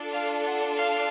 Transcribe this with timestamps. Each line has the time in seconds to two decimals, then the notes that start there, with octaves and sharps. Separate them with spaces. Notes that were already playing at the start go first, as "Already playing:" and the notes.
Already playing: D4 F4 A4
0.13 F5
0.47 F#5
0.80 F5